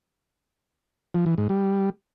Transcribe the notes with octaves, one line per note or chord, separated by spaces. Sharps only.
F3
E3
G#2
G3